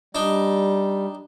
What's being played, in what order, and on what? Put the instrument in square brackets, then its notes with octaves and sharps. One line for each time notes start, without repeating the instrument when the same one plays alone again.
[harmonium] G3 [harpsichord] D4 D#4